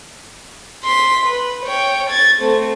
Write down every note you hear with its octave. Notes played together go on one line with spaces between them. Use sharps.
C6 B6
B4
C#5 G5
G#6 A6
A3 C4